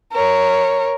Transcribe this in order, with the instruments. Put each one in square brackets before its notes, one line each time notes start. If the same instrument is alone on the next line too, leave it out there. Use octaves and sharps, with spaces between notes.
[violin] A#4 C#5